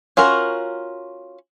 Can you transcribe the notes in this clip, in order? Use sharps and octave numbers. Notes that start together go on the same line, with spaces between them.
C#4 F4 F#4 A#4